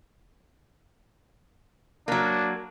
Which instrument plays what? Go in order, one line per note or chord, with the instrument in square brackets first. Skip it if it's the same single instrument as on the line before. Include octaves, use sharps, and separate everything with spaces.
[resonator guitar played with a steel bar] F#3 A#3 [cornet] D4